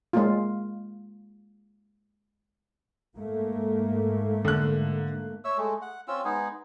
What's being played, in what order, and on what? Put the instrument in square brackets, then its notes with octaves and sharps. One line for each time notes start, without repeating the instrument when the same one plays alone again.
[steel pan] G#3 A#3 F4
[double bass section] G#2 A3 A#3
[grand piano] D3 F#6
[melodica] C#5 E5 E6
G#3 A3
F#5
C4 C#4 F4 E6
G#3 B3 D#4 G#4